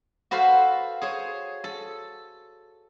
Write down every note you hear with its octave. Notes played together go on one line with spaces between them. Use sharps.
F#4 A4 B4 C5 F5
G#4 C5 C#5
A4